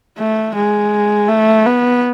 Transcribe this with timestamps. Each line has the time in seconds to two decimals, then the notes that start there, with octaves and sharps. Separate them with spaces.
0.18 A3
0.55 G#3
1.28 A3
1.65 B3